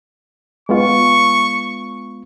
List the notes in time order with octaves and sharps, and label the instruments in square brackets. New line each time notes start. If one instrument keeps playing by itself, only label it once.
[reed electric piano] G#3 B3 F4 [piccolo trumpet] C#6